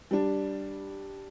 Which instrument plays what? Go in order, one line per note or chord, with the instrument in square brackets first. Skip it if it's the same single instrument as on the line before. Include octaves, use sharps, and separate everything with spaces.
[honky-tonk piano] G3 D4